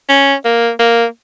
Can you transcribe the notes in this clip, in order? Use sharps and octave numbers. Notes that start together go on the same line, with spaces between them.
C#4
A#3
A#3